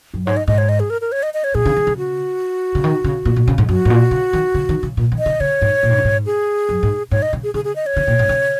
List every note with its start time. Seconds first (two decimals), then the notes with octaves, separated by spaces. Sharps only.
0.14 F#2
0.26 G#2 C#5
0.37 D#5
0.47 G#2 D#5
0.58 C#5
0.69 D#5
0.80 G#4
0.90 A#4
1.01 A#4
1.12 C#5
1.23 D#5
1.34 D#5
1.44 C#5
1.55 A#2 G#4
1.65 C#3
1.76 D#3
1.87 C#3
1.98 F#4
2.75 C#3
2.84 D#3
3.04 C#3
3.25 A#2
3.36 A#2
3.48 C#3
3.58 G#2
3.69 F#2 F#4
3.85 G#2
3.90 A#2
4.11 C#3
4.33 D#3
4.55 C#3
4.69 D#3
4.83 C#3
4.97 A#2
5.12 D#3
5.19 D#5
5.26 C#3
5.40 C#3 C#5
5.62 G#2
5.83 A#2
5.91 G#2
5.98 F#2
6.05 G#2
6.26 G#4
6.69 F#2
6.83 G#2
7.11 G#2 C#5
7.22 D#5
7.33 C#3
7.44 G#4
7.54 C#3 G#4
7.64 G#4
7.76 D#5
7.86 C#5
7.96 C#3
8.07 A#2
8.19 G#2
8.29 C#3